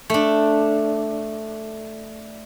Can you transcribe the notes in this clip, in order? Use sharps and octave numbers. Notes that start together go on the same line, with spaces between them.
A3 D4